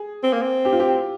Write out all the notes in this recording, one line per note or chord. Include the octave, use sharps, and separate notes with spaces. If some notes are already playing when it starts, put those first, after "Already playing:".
Already playing: G#4
C4
A#3
C4
G4
F4
G4